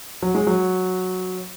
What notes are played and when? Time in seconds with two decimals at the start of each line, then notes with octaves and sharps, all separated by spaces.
0.23 F#3
0.35 G#3
0.47 F#3